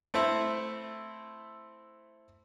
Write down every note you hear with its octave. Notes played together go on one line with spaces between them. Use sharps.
A3 C4 E4